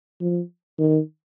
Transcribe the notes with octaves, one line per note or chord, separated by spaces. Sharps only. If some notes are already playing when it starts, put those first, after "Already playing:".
F3
D#3